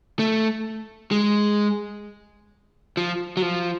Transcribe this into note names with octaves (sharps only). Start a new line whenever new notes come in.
A3
G#3
F3
F#3
F3